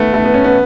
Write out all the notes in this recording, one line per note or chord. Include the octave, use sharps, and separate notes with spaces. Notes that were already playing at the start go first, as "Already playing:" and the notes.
Already playing: A3 B3
A3
B3
C#4
B3